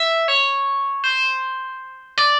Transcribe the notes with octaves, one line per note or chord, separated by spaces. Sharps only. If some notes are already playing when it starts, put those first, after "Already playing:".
Already playing: E5
C#5
C5
D5